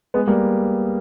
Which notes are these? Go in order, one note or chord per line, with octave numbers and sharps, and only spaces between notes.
G#3 B3
G3 A#3